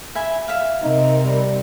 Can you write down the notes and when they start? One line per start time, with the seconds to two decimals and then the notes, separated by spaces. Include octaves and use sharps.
0.15 E5 G#5 B5
0.48 E5 F5
0.83 C3 C4 D#4 A#4
1.25 G3